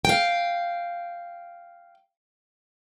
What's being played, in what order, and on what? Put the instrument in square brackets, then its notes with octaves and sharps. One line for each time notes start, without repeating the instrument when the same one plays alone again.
[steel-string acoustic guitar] F5 G5